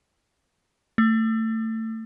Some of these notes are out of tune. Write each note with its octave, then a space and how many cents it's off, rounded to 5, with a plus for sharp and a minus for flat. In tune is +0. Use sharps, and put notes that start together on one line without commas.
A3 +25